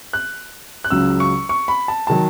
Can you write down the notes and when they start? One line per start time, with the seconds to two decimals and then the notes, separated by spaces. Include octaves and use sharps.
0.13 F#6
0.84 F#6
0.90 C#2 C#3 F#3 E6
1.20 C#6
1.49 C#6
1.68 B5
1.88 A5
2.07 D#3 F#3 A5